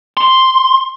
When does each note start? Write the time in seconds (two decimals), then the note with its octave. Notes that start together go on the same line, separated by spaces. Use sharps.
0.17 C6